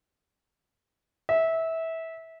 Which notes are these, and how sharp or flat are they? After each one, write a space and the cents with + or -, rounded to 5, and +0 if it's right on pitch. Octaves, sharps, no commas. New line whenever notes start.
E5 -20